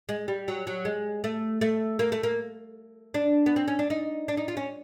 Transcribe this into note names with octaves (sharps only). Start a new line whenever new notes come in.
G#3
G3
F#3
F#3
G#3
A3
A3
A#3
A3
A#3
D4
B3
C4
C#4
D4
D#4
D4
D#4
F4
C#4